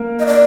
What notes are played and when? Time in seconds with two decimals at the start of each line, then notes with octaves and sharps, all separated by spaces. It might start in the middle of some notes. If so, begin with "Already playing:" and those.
Already playing: A#3 A#4
0.20 D#5
0.26 D5